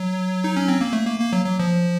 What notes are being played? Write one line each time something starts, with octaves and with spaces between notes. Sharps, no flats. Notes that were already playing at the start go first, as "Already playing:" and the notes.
Already playing: F#3
D#4
C#4
C4
A#3
A3
A#3
A#3
F#3
F#3
F3